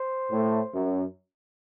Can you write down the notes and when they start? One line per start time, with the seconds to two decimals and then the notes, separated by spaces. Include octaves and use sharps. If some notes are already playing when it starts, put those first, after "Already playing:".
Already playing: C5
0.31 A2
0.74 F#2